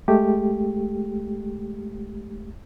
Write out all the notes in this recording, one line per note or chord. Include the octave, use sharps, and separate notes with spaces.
G#3 A3 G4